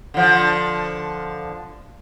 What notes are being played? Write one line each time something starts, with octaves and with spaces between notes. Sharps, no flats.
D3 F3